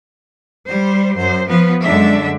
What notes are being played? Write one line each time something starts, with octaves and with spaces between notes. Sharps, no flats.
G3 C5
F#2 C5
F3 B3 B4
F#2 D3 G#3 D4 E5